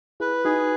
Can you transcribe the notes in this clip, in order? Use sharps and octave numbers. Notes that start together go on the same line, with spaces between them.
E4 G#4 B4
D#4 F#4 G#4